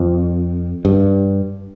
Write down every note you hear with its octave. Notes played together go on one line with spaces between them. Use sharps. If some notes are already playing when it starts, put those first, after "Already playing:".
Already playing: F2
G2